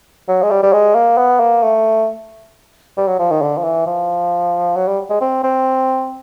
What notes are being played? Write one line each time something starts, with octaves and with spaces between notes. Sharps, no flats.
F#3
G#3
G3
G3
G#3
A#3
B3
A#3
A3
G3
F#3
F3
D#3
D3
F3
E3
F3
F#3
G3
G#3
C4
C4